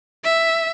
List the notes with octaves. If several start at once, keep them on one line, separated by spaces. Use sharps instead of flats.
E5